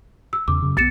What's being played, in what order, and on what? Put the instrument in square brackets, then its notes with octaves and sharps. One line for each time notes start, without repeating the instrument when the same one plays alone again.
[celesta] E6
[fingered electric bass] E2 C#3 [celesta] D6
[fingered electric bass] F#2 C#3
[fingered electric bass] B1 B3 [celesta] A6 C#7 E7